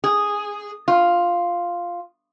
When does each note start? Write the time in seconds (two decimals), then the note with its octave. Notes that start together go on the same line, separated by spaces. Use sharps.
0.04 G#4
0.88 F4